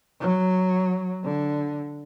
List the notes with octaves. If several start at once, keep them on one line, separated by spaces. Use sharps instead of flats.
F#3
D3